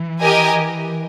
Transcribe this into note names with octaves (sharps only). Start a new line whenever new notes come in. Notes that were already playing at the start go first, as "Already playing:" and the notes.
Already playing: E3
G4 A#4 D#5 G#5